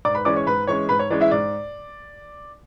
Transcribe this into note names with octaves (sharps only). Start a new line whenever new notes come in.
G#2 D5 D6
B4 B5
E3 G#3 C#4 D5 D6
C#5 C#6
G#2 B4 B5
E3 G#3 C#4 C#5 C#6
G#2 B4 B5
C#5
E3 G#3 C#4 D5
E4 E5
G#2 D5